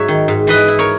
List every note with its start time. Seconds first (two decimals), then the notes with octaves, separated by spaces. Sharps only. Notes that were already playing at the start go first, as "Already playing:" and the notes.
Already playing: G#2 F#3 C#5 E5
0.08 D#3
0.28 G#2
0.47 E3 B4 D#5
0.68 E4
0.79 A#4 C#5